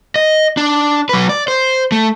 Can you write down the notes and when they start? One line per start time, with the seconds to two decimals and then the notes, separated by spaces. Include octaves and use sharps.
0.16 D#5
0.57 D4
1.09 F#3 B4
1.29 D5
1.48 C5
1.92 A3